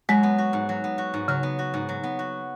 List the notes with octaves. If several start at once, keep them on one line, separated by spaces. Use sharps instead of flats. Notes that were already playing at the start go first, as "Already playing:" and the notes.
F#3 G#3
B3
F#4
G#2
F#3
B3
F#4
G#2
C#3 F#3
B3
F#4
G#2
F#3
B3
F#4